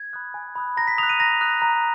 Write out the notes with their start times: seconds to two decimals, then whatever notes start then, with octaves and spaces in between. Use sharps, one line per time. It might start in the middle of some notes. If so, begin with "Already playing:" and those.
Already playing: G#6
0.13 B5 D#6 F#6
0.34 G#5
0.55 B5 D#6 F#6
0.77 A#5 A#6
0.87 B6
0.98 D#6 F7
1.03 F#6
1.09 D#7
1.20 A#5 A#6
1.41 D#6 F#6
1.62 A#5